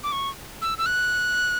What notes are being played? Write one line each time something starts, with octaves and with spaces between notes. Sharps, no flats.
D6
C#6
E6
E6
F#6